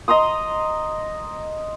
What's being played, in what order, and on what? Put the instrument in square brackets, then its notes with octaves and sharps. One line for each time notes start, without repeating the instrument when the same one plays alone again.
[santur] D#5 A#5 C6 D#6